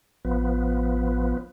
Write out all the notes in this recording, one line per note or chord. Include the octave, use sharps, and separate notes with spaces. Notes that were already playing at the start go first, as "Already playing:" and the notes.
A1 F3 B3